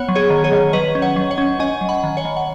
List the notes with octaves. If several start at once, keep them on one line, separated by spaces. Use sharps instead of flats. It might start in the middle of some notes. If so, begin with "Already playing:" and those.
Already playing: B3 C#5 F#5
F#3
G#4 C#5
D#3
G#4 C#5
D#3
F#3 B4 D#5
C#4
C#5 F#5
F#3
C#5 F#5
C#4
C#4 D#5 G#5
F#3
F#5 B5
D#3
C#5 F#5
D#3
F#5